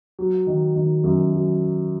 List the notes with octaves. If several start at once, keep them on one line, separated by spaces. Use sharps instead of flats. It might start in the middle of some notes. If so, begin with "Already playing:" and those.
F#3
D#3
D#3
F#2
F#3